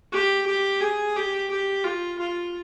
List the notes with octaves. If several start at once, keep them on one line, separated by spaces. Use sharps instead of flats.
G4
G4
G#4
G4
G4
F4
F4